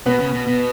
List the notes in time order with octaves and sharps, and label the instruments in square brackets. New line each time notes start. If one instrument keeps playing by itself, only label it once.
[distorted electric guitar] B2 [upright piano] B3 B4
[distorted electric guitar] C#3
B2
B2